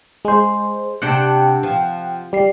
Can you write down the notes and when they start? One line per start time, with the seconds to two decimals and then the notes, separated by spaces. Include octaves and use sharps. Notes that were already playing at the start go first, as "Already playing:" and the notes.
0.25 G#3 C5
1.02 C3 D4 F#5 G5
1.63 F3
2.33 G3 C7